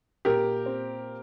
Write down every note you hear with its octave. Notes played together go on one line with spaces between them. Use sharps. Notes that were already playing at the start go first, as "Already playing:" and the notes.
A#2 G4 A#4
C4